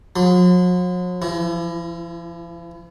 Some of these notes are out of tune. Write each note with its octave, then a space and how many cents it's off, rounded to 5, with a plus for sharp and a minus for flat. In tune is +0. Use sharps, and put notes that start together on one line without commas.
F#3 -45 C6 -40
F3 -40 E4 +20